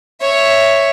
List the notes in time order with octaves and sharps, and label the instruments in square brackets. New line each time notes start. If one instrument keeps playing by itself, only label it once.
[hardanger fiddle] C#5 E5